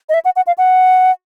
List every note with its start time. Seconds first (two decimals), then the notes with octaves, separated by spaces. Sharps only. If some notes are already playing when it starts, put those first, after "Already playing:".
0.09 D#5
0.14 E5
0.25 F#5
0.36 F#5
0.47 F5
0.58 F#5